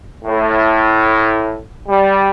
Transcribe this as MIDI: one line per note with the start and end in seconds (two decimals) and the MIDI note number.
0.25 1.59 45
1.89 2.30 55